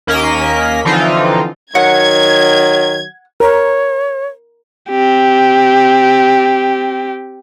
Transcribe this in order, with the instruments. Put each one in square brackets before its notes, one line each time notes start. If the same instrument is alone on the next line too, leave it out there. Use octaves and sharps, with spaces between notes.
[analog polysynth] D#2 A#3 C#4 A#4 D#5 B6
D3 E3 F3 C4 D#4 F4
[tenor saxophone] D#3 [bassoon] F#3 [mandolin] F#5 [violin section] G#6
[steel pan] A#4 [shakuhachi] C#5
[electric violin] C4 G4